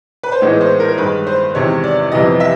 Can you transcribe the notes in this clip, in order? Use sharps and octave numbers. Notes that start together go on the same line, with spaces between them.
B4
C5
A2 E3 G#3 B3 D#4 C#5
C5
A#4
G2 D#3 G#3 B4
C5
E2 C3 D#3 G#3 C#5
D5
F2 C3 E3 G3 B3 D#5
E5